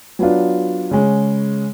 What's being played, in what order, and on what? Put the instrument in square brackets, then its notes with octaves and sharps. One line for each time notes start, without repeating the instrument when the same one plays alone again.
[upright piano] F#3 B3 D4 F4
C#3 G#3 C#4